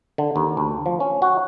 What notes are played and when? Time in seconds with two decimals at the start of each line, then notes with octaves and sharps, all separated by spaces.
0.18 D3
0.36 D#2
0.57 D2
0.86 F3
1.00 C#4
1.22 F#4